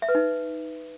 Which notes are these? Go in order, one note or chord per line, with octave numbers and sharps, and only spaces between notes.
E5
B4
D#4